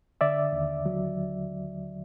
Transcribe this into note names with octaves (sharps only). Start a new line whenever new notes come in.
D3 D5 E5
D#2
F#3